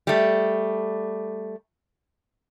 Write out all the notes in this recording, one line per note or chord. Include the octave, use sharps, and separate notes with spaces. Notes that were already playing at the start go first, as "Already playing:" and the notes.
G3 A3